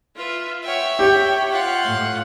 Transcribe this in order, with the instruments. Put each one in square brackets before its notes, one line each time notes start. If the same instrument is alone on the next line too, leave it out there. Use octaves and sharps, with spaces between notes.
[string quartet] F4 B4 E5
[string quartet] C#5 F#5 G5 [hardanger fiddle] E5
[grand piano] G4 [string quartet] C#5 G5 B5
[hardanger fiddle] F4 F#5
[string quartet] A2